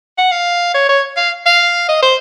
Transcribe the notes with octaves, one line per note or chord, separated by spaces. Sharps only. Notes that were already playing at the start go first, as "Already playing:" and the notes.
F#5
F5
C#5
C#5
F5
F5
D#5
C5